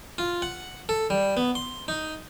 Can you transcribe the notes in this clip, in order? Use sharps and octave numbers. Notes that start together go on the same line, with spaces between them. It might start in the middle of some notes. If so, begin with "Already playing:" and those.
F4
F#5
A4
G3
B3
C6
D#4